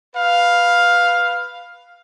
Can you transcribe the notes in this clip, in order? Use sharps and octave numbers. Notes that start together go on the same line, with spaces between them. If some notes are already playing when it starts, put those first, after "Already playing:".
B4 F5